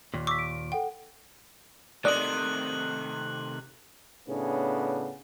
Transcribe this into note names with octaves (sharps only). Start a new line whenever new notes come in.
D#2 A#2
C#6 D6 E6 B6
D7
A4 F#5 G5
C3 D#3 A3 D5 D#5 F#6 F#7
A2 C#3 B3 D4